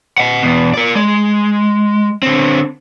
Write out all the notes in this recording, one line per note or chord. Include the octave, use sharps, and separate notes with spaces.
D#5 F#5
E2 B2
A#4 D5
G#3
D3 C4